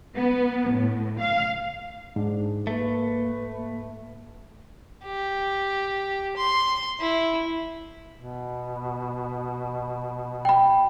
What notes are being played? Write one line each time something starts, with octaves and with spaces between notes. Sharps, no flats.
B3
A2
F5
G#2 D4
A3 A#3 B4
A#3
G4
C6
E4
B2
G5 B5